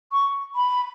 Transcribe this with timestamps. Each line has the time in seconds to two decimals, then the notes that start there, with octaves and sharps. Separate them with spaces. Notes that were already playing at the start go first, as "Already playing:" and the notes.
0.12 C#6
0.55 B5